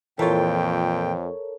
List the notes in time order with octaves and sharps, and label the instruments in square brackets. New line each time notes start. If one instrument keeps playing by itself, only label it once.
[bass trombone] F2 [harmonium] A#2 G5 [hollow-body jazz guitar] E3 F4 [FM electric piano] A4 A#4 C#5